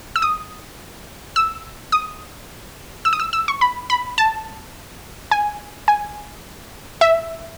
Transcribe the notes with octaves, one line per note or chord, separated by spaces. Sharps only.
E6
D#6
E6
D#6
E6
D#6
E6
E6
C#6
B5
B5
A5
G#5
G#5
E5